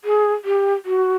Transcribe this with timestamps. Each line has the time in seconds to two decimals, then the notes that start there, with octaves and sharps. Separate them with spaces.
0.05 G#4
0.45 G4
0.86 F#4